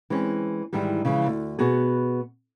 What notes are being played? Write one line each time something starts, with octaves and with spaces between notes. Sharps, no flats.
E3 G#3 C4 C#4
G#2 D#3 E3 G3
C#3 E3 F3 G#3
D2
B2 B3 F#4 G#4